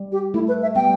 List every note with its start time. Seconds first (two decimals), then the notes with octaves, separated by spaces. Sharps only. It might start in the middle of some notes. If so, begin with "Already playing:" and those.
Already playing: G3
0.12 G4
0.34 A3 E4
0.48 B4
0.62 E5
0.75 G3 B3 G5